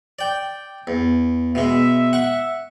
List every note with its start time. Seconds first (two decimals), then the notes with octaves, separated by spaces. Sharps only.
0.19 D5 G5
0.87 E2
1.55 B2 G#3 E5
2.13 F#5 C#6